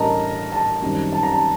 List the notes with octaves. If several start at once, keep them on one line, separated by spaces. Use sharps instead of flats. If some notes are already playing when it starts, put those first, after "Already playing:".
Already playing: A1 A2 G3 D4 A#4 D#5 A5 A#5
A5
F#2 D#3 G3 C4
A5
A#5
A5